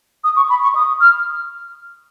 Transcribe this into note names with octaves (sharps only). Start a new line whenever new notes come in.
D#6
C#6
B5
C#6
D#6
F6